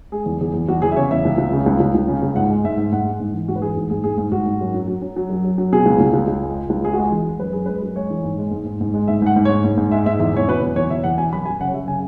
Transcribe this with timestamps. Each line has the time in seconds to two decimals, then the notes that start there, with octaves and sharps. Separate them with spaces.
0.12 G#3 G#4
0.26 E2
0.41 E2 G#4
0.54 E2
0.68 E2 F#4
0.82 E2 G#4
0.92 E5
0.97 C#3 C#5
1.11 E2 E5
1.25 C#2
1.38 C#2
1.52 C#3
1.66 C#2
1.80 C#2
1.95 C#2
2.08 C#3
2.23 C#2
2.36 G#2 F#5
2.50 G#3
2.64 G#2 E5
2.78 G#2
2.92 G#2 F#5
3.06 G#3
3.20 G#2
3.34 E3
3.48 G#2 F#4
3.56 B4
3.62 E3 G#4
3.76 G#2
3.90 G#2 G#4
4.04 G#2 G#4
4.18 G#2
4.32 G#2 F#4
4.46 G#2
4.61 F#2
4.74 F#3
4.88 F#3
5.02 F#3
5.16 F#3
5.30 F#2
5.44 F#2
5.58 F#3
5.72 B2 G#4
5.86 C#2
6.01 C#2
6.14 C#2
6.28 C#2
6.43 G#3
6.56 G#3
6.70 C#2
6.84 G#3 G#4
6.93 F#4
6.98 G#3 G#4
7.12 E3
7.26 G#3
7.40 F#2 B4
7.53 F#2 G#4
7.66 G#3 B4
7.82 F#2
7.96 G#3 C#5
8.10 E3
8.24 G#2
8.38 G#3
8.52 G#2
8.66 G#2
8.81 G#2
8.94 G#3
9.08 G#2 E5
9.22 G#2 F#5
9.36 G#2
9.45 C#5
9.50 G#2
9.64 G#2
9.78 G#2
9.92 G#3 E5
10.06 G#2 E5
10.20 E2 E5
10.34 E2 C#5
10.48 B2 B4
10.61 E2
10.76 E2 C#5
10.90 E2 E5
11.04 E2 F#5
11.17 B2 G#5
11.33 F#2 B5
11.46 F#2 G#5
11.61 C#3 F#5
11.68 C#5
11.74 F#2 E5
11.88 C#3 G#5